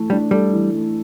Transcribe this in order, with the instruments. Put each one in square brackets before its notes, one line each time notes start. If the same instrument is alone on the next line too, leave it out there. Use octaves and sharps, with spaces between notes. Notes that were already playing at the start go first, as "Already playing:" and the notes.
Already playing: [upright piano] E3 A3
[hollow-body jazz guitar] G3 [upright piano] D4
[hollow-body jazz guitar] G3 [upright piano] A4
[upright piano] E3
A3